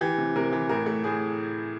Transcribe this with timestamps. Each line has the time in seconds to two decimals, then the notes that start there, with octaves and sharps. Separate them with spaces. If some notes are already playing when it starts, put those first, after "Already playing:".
0.01 E3 G4
0.18 C3
0.36 C3 A#4
0.53 E3
0.69 A2 A#4
0.86 A3
1.04 A2 G#4